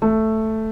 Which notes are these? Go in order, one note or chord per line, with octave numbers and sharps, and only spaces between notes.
A3